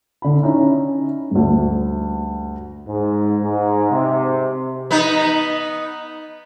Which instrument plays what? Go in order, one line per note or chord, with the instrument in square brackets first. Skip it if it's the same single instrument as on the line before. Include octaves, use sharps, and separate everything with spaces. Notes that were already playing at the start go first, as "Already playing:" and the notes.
[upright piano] D3 B5
C#4 D#4 E4
D2 G2
[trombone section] G#2
G#2
C3
[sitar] B3 D#4